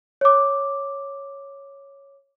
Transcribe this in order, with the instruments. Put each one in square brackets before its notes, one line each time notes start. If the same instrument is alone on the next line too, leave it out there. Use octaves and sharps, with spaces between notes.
[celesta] C#5 D6